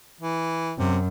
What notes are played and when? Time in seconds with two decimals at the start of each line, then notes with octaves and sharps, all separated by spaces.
0.21 E3
0.78 F#2 C3